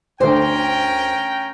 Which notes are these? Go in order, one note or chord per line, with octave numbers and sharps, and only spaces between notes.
D2 D3 A3 C#4 G4 A#4 C5 G5